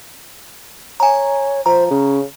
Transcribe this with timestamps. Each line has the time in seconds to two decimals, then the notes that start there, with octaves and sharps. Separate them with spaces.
1.00 C#5 G#5 A#5
1.66 F3 C5 A#5
1.90 C#3 C#4